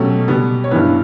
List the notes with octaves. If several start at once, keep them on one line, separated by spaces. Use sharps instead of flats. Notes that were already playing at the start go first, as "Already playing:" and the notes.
Already playing: B2 F#3 A3 C#4 G4
B2 G3 B3
C#5
G2 E3 B3 B4